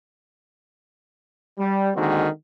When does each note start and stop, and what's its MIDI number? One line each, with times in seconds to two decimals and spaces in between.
1.59 1.91 55
1.95 2.27 50
1.95 2.27 51
1.95 2.27 56
1.95 2.27 58
1.95 2.27 60
1.95 2.27 66